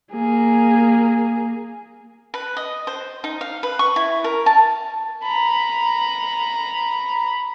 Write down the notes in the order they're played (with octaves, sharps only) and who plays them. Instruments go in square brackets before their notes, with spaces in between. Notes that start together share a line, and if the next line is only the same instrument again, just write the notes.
[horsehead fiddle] A#3 G#4
[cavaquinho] B4
D#5
C5
D#4
F5
B4
C#6
E4
A#4
A5
[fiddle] A#5 B5